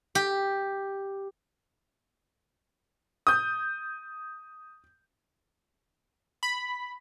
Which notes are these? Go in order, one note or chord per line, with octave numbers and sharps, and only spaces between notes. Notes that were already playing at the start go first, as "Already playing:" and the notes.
G4
D#6 G6
B5